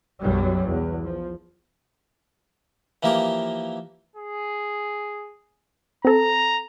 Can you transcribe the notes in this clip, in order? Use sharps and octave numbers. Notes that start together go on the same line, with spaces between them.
B1 F#2 F#3 G3
E2
F3
E3 F3 A#3 G4 A#4 A#5
G#4
C4 A4 A#5